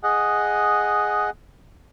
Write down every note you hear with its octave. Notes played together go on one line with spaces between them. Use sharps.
G#4 D#5 F#5